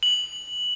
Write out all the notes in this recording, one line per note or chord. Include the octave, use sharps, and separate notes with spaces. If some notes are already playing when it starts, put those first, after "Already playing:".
F#7